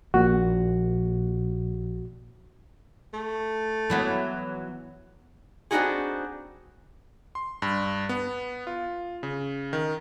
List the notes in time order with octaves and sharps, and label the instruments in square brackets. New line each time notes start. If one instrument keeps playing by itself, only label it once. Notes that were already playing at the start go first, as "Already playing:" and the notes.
[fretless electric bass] A#1 [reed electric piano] A#2 F#4
[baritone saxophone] A3
[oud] E3 F#3 B3
[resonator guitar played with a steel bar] B3 C4 D4 D#4 F#4 G#4
[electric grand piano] C6
G2
B3
F4
C#3
D#3